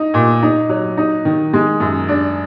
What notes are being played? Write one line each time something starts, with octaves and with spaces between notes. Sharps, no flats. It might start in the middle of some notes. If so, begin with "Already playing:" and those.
Already playing: D#4
A#2
D#4
F#3
D#4
D#3
G#3
F#2
D4